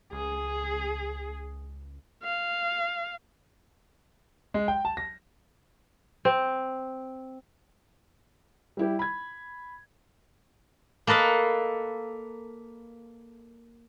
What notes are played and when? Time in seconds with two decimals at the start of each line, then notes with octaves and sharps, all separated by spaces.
0.12 C#2 G#4
2.23 F5
4.54 G#3
4.68 G5
4.85 A5
4.97 A#6
6.25 C4
8.77 G3 E4 G4
8.99 B5 G#6
11.07 A#3 A4 B4 D#5 F5